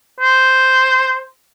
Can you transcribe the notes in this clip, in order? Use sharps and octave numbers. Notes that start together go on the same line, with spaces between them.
C5